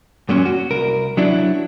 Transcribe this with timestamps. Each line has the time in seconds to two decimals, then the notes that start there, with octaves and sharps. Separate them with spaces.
0.29 F#2 A#2 F#3 C#4
0.45 F#4
0.71 C2 A#4
1.17 F#3 D4 E4